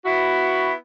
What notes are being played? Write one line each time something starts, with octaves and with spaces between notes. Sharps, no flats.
B3 E4 F#4